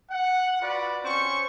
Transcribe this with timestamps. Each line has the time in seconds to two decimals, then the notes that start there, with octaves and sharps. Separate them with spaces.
0.10 F#5
0.61 F4 F#4 B4 D5
1.04 C4 C#4 C5 C#6